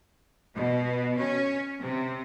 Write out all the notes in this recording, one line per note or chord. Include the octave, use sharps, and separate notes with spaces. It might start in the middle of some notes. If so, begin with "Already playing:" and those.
B2
C#4
C3